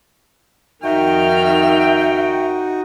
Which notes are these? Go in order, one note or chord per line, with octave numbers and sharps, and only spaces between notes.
F2 D#3 D#4 F#4 E5 G5 F6